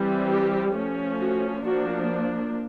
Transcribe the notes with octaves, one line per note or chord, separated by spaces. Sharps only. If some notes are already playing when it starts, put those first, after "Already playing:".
Already playing: E3 G3 C4
G4
F3 A3 C#4
F#4
F3 A#3 D4 F#4